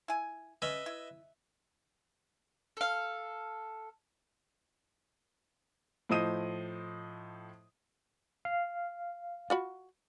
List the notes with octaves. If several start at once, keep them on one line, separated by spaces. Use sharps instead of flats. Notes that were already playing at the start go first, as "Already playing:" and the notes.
E4 G#5
C#4 B4 D#5 E5
E4
A4 F5
A2 F3 C5 D#5 D#6 D#7
F5
F4 F#4 B5